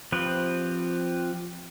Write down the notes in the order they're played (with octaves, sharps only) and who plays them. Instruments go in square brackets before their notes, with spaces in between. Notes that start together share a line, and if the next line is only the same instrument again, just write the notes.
[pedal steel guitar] F3 C4 G4 B4